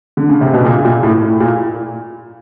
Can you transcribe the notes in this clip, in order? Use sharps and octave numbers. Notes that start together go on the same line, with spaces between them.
D3
C#3
C3
B2
A#2
A#2
A2
A2
A#2